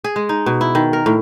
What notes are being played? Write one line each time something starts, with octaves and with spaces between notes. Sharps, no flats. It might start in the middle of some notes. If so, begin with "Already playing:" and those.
G#4
G#3
D#4
B2
E4
D#3
A#4
A2